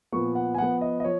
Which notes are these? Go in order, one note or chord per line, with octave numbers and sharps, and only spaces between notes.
A#2 F3 B3 C#6
F#5
G#5
F3 B3 F#5
D#5
D#5
F3 C#5